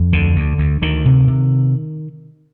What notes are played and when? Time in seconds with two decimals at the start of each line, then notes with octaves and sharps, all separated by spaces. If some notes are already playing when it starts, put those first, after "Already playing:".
Already playing: F2
0.13 D2 D3
0.36 D2
0.58 D2
0.82 D2 D#3
1.05 C3
1.28 C3